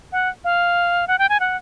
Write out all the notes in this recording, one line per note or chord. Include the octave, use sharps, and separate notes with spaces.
F#5
F5
F#5
G5
G#5
F#5